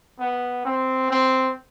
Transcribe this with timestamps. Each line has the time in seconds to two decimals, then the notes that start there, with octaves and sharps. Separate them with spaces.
0.19 B3
0.65 C4
1.11 C4